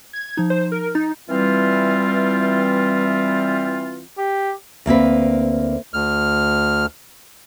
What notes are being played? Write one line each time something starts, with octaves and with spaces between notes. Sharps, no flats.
G#6
F3 D#4
C5
A#4
D#4 A6
E3 G3 C4 F4
G4
D2 A#3 C4 B4
D2 F6